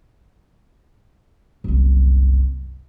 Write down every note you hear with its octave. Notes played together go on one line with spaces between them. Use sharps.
F#1 C2